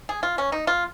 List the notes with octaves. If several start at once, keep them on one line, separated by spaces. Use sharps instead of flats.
G#4
F4
C#4
D#4
F4